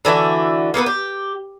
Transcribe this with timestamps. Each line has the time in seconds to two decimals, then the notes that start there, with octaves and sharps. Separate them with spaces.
0.05 D3 E3 A3 F#4
0.74 A#3 B3 A4 B4
0.86 G4